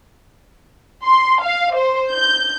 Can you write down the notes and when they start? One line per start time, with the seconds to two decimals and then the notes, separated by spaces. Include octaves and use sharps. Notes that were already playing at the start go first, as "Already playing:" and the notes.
1.04 C6
1.42 F5
1.76 C5
2.12 G6